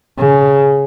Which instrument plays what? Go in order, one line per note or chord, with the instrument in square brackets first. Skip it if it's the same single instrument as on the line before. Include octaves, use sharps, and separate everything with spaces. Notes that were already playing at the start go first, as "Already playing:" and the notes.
[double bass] C#3